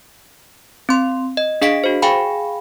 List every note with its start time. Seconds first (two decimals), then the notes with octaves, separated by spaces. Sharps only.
0.89 C4 C6
1.37 D#5
1.62 D4 G#4 D#5 F5 B6 D7
1.84 F#4 C5
2.02 G#4 F5 G5 G#5 B5